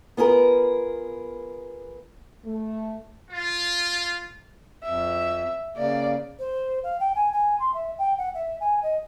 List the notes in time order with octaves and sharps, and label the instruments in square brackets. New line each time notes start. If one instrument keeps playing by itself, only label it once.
[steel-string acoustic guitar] B3 F4 G#4 A#4
[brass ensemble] A3
[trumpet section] F4
[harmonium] F2 [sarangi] E5
[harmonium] C#3 A#3 [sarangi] D5
[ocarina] C5
F5
G5
G#5
G#5
C6
E5
G5
F#5
E5
G#5
D#5